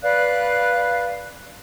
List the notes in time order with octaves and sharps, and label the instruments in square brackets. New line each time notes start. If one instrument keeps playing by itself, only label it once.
[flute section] B4 D5 F5 F#6